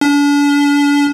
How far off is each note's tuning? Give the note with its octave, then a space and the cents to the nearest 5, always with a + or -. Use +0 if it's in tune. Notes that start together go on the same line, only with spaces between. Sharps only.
D4 -40